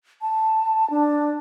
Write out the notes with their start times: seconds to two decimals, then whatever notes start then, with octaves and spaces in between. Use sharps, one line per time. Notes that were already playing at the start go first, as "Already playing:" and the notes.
0.22 A5
0.90 D4